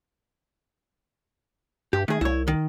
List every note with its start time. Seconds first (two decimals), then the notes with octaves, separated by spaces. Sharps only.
1.93 G2 G4
2.08 D#3 A3 G#4
2.21 C2 E4 C#5
2.48 D#3